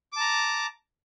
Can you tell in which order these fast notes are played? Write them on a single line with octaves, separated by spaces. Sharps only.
D6 A5 A#5